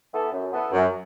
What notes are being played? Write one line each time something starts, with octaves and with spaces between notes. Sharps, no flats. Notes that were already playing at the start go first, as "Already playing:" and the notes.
E3 B3 A4
F#2
E3 B3 A4
F#2 F#3